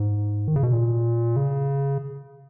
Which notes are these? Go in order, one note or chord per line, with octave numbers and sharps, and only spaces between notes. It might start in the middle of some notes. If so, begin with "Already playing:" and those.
Already playing: G#2
D#3
C#3
B2
A#2
C#3